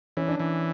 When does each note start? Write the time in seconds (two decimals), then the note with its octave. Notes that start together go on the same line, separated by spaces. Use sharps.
0.17 E3 C#4
0.28 D4
0.39 E3